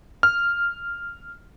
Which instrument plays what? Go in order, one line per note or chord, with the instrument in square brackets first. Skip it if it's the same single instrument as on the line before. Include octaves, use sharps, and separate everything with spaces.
[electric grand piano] F6